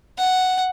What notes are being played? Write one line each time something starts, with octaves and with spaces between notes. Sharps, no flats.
F#5